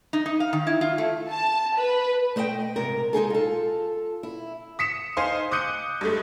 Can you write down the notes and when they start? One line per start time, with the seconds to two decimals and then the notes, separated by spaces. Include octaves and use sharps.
0.13 D#4
0.26 D#4
0.40 F5
0.53 D#3
0.67 E4
0.81 F4
0.98 A3
1.30 A5
1.76 B4
2.36 A3 C5 D#5 E5 G5
2.76 G#2 C3 A#4
3.13 G#3 D#4 G#4 A4
3.30 F4 A4
4.23 E4
4.79 D#6 B6 C#7 E7
5.17 D#4 C5 F5 G#5 C6
5.51 D6 D#6 F#6 G6 C#7 D#7
6.01 G2 G#3 A3